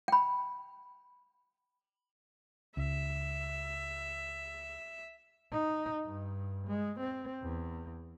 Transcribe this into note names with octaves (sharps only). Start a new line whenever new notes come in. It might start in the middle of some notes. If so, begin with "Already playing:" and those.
G5 B5
C#2 E5
D#4
G2
G#3
C4
E2